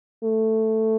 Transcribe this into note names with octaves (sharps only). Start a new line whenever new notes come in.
A3